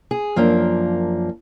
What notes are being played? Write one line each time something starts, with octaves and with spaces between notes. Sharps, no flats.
G#4
F#2 F3 A#3 D4